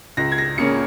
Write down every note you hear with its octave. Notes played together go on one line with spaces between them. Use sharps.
C#2 A#6
G#6
A#6
C#3 A#3 C#4 C#7